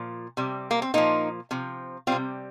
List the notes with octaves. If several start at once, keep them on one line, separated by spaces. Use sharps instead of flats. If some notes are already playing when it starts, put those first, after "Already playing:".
Already playing: A#2 F3
C3 G3
A#3
C4
A#2 F3 A#3 D#4
C3 F3
C3 G3 C4 F4